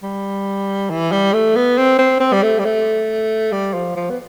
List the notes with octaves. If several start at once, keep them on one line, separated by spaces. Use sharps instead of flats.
G3
E3
G3
A3
B3
C4
C4
C4
G3
A3
G3
A3
G3
F3
F3
B3